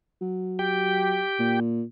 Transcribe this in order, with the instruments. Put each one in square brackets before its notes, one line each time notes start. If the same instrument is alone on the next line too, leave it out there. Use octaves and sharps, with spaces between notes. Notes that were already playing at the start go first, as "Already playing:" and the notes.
[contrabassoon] F#3
[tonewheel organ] G4 G5
[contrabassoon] A#2